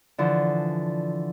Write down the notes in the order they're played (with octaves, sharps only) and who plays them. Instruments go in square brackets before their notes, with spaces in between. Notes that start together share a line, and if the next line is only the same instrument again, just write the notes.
[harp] D3 E3 F3